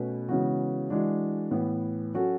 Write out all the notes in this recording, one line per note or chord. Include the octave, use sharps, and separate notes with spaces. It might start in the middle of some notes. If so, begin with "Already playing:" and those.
Already playing: B2 A3 C#4 B4
C#3 E3 G#3 B3 F#4
E3 G#3 D4 F#4
A2 E3 B3
F#3 C#4 F#4 A4